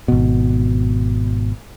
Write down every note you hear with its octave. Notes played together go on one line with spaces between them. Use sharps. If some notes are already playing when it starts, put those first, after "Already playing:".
G#1 B2